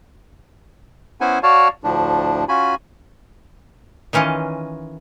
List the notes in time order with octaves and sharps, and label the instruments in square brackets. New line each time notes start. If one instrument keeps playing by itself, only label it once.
[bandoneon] B3 C#4 E4 C5 F#5 G#5
F#4 C#5 D5 F5 A5
D2 A2 F3 D4
C#4 F4 F#4 G#5 B5
[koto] D#3 E3 C#4 F4 D#5